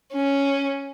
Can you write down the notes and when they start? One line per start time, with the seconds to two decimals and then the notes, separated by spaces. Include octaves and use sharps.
0.13 C#4